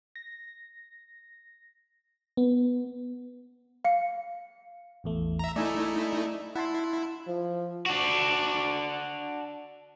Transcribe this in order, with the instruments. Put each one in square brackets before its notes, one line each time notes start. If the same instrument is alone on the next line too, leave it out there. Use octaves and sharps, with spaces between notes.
[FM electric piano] A#6
B3
[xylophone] F5 C#7
[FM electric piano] A1 E2 A3
[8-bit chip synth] E5 A#5
[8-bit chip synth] A3 D#4 E4 [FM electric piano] D5 G#5 E6
[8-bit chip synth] E4 [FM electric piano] F#5 A5 C6
[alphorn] F3
[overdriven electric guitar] D4 F#4